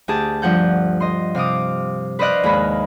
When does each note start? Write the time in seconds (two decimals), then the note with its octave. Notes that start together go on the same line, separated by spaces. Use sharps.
0.08 D2 G4 G#4 A5
0.42 G2 F3 F#5 G6
1.00 D#5 C6
1.35 C3 F5 D6 D#6
2.19 B4 C5 D5 D#5 F5 F#6
2.44 D#2 G#2 G#4 B5